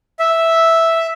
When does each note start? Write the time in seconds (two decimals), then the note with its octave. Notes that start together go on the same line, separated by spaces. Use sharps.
0.19 E5